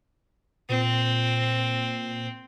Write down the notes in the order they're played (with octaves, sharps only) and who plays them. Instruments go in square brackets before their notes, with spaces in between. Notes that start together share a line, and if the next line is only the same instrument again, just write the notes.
[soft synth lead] A#2 [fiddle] C4